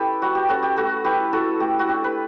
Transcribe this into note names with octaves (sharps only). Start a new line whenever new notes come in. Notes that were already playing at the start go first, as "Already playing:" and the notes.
Already playing: C#4 E4 G4 A4 B4
G3 F#4
G4
C#4 F#4 A4
G4
A3 F#4 A4
E4 G4 B4
E4 F#4 A4
A3 G4
F#4
D4 G4
B4